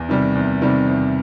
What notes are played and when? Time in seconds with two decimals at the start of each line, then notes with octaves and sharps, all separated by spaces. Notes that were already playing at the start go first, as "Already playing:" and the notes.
Already playing: E2
0.09 C3 D#3 G3
0.35 E2
0.62 C3 D#3 G3
0.88 E2